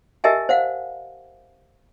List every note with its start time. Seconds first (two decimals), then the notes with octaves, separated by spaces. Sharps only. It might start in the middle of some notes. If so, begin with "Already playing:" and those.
0.24 G4 A#4 D#5 E5 G#5 A5
0.49 C5 F5 F#5